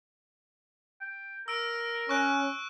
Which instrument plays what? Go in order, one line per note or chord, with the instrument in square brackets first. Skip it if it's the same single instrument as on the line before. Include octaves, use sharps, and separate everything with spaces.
[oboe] G5
[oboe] A#4 [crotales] E6 D7
[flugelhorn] C#4 [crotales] C#6 F#6 D7